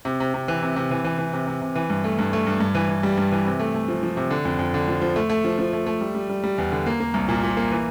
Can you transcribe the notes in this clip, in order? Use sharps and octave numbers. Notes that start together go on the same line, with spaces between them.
C3
C3
C3
E3
C3
C3
E3
E3
E3
C3
C3
C3
E3
G2
A3
G2
A3
G2
G2
E3
E3
G3
G2
E3
C3
A3
A3
F3
F3
C3
D3
F2
F2
D3
F3
F3
A3
A3
F3
F3
A3
A3
G3
G3
G3
G3
E2
D3
A#3
A#3
C2
A#2
A#2
A#3
E3